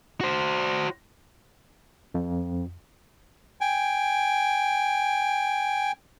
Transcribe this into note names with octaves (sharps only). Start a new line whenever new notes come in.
F#4 C5
F2
G5 G#5